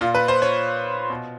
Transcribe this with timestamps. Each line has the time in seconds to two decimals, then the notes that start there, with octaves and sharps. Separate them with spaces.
0.01 A#2 F4
0.14 B4
0.28 C5
0.42 C#5
1.10 B2